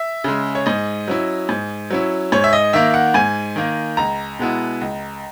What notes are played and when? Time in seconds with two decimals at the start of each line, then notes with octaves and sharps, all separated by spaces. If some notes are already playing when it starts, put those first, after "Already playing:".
Already playing: E5
0.24 C#3 G#3
0.55 C#5
0.66 G#2 D#5
1.08 F#3 C#4 E4
1.49 G#2
1.90 F#3 C#4 E4
2.32 G#2 C#5
2.44 E5
2.53 D#5
2.73 D#3 A#3 E5
2.94 F#5
3.14 G#2 G#5
3.56 D#3 A#3
3.97 C#2 A#5
4.39 B2 G#3 B3 E4
4.81 C#2